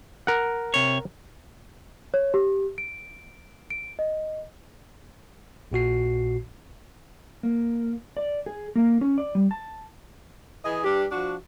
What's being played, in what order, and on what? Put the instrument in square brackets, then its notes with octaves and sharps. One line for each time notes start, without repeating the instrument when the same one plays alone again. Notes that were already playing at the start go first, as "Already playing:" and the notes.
[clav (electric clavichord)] A#4 F#5
[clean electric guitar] C3 C#5
[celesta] C#5
G4
D7
D7
D#5
[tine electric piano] A#1 A#2 F#4 C7
[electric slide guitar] A#3
D5
G#4
A#3
C#4
D5
G3
A5
[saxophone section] E3 G#4 D#5
G3 D4 G4 B4
F3 D4 F#4